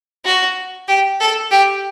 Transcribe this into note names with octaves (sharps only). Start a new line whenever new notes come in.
F#4
G4
A4
G4